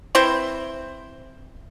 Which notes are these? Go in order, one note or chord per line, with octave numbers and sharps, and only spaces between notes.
C4 E4 B4 C5